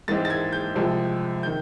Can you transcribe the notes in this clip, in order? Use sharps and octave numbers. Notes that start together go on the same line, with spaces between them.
G#2 E3 G#3 C4 A6
A6
G#6
G6
C2 C3 F3 G#3 C4
D#3 G6